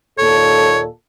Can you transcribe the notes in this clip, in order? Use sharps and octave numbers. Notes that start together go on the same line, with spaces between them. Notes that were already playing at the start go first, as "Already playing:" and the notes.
D#2 A#2 A4 C#5